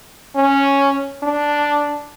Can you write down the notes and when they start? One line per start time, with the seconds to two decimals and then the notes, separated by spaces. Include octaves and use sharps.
0.36 C#4
1.23 D4